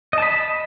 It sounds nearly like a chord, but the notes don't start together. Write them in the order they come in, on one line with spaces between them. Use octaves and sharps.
D#5 A5 B5